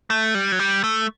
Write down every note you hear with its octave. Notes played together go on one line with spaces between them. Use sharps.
A3
G3
F#3
G3
A3